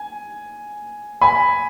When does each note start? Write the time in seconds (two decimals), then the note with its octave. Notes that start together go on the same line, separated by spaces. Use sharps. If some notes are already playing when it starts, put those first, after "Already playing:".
Already playing: G#5
1.21 G#5 B5